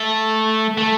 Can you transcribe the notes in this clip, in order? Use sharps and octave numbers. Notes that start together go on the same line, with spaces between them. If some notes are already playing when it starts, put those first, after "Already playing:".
Already playing: A3
A3